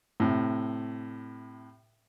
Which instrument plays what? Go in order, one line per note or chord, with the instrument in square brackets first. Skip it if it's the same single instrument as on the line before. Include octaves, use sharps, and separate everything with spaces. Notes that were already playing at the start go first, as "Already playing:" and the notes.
[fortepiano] A2 C3